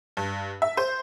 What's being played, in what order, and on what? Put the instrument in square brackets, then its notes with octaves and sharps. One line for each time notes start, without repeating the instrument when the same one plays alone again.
[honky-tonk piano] G2
E5
C5